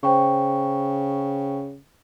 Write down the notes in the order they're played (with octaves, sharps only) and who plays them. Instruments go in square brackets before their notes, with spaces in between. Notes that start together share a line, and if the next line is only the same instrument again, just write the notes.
[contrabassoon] C#3 [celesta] C5 G5 C#6